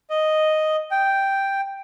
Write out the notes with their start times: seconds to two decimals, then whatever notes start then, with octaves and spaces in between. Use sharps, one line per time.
0.10 D#5
0.91 G5